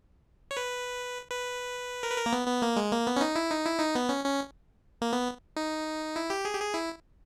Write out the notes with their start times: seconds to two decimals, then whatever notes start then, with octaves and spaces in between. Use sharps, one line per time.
0.51 C#5
0.57 B4
1.30 B4
2.03 A#4
2.11 B4
2.18 A#4
2.26 A#3
2.33 B3
2.47 B3
2.63 A#3
2.76 G#3
2.92 A#3
3.07 B3
3.16 C#4
3.21 D#4
3.36 E4
3.51 D#4
3.65 E4
3.80 D#4
3.95 B3
4.09 C#4
4.25 C#4
5.02 A#3
5.13 B3
5.56 D#4
6.16 E4
6.30 G4
6.45 G#4
6.54 G4
6.60 G#4
6.74 E4